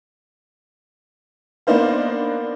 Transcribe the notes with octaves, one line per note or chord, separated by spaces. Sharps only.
A#3 B3 D4 D#4 C5 F5